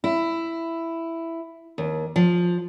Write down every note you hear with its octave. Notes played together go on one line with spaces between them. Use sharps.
E4
D#2
F3